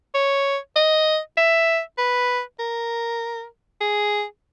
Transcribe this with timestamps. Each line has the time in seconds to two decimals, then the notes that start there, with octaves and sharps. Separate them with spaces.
0.15 C#5
0.76 D#5
1.37 E5
1.98 B4
2.60 A#4
3.81 G#4